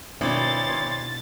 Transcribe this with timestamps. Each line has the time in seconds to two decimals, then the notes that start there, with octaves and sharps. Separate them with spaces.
0.21 G#1 B2 D4 E4 C#5 C6 A6